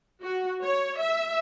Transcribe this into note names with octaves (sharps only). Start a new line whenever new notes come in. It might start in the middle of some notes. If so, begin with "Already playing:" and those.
F#4
C#5
E5